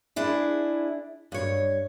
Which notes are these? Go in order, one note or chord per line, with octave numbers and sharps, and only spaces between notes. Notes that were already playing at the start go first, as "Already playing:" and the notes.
D4 E4 G#4
G2 C#5